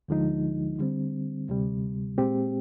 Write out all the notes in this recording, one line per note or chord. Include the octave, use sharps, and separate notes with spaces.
D2 D3 F3 G#3 D#4
D3 G3 C4
D2 C3 G3
A#2 G#3 C4 G4